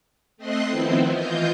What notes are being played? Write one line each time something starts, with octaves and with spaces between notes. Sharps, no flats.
A3 C4 D#5 C6 F#6 C7
D#3 F3 B3 C4 E4
E3 F4 D#5 G6